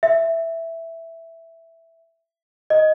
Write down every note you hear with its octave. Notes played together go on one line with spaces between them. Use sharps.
E5
D#5